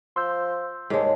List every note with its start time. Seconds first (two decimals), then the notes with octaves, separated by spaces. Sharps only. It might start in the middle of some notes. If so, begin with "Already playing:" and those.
0.16 F3 C6 E6 G6
0.90 D#2 G#2 G#3 C#5 A5